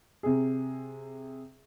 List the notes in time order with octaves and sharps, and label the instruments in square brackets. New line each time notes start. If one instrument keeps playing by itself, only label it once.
[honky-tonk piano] C3 G#4